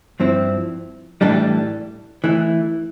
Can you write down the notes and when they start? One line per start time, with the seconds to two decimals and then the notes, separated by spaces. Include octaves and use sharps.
0.20 G2 F3 C4 E4
1.21 A2 E3 G3 D4 A4
2.24 E3 A3 E4